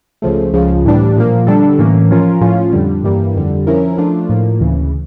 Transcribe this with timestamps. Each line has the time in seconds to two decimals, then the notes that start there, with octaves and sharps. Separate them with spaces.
0.22 C#2 C#3 F3 A3
0.53 C#2 C#3 F3
0.85 A2 E3 G3 D4
1.16 A#2 F3 A#3
1.47 D3 G3 D4 A4
1.79 A2 E3 A#3 C#4
2.10 F3 C#4 F4 A#4
2.41 A2 F3 C#4 F4
2.73 F2 D3 G3
3.04 G2 E3 G3 A#3
3.35 F2 D3 G3
3.67 F3 C#4 E4 A#4
3.98 F3 A3 D4 F4
4.29 A2 F3 A#3
4.60 D2 C#3 E3